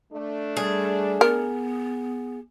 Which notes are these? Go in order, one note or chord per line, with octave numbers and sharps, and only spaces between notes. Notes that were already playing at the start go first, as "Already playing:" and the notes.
A3 D4
G3 G#4
B3 A#4